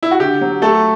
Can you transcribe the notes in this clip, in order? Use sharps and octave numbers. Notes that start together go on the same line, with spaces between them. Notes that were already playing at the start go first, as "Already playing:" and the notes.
E4
F#4
D3 G4
F#3
A3 A4